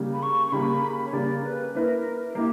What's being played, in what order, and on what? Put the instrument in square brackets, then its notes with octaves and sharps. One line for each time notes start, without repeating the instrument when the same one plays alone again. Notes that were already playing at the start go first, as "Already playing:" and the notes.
Already playing: [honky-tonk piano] C#3 G3 A#3
[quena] B5
C#6
C#6
[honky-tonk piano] C#3 G3 A#3 [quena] B5
[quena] C#5
[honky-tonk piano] C#3 G3 A#3 [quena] D5
[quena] B4
[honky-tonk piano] A#3 E4 B4 [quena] A#4
[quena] A#4
[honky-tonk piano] A#3 E4 [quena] G4